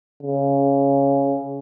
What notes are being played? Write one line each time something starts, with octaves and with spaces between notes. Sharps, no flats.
C#3